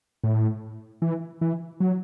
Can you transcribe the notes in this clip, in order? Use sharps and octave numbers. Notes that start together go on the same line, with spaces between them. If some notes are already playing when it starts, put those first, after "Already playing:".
A2
E3
E3
F#3